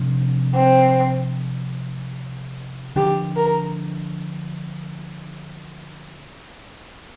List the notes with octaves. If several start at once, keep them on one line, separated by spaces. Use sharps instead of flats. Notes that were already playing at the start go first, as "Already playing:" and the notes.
Already playing: C3 F3 D4
C4
D3 F3 D4 G4
A#4